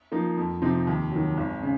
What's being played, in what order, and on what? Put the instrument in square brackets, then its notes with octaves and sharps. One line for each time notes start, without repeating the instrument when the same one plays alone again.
[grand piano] F3 A#3 D#4
F2
C3 F3 C4 D#4
D#2
D#3 F#3
G#1
C#3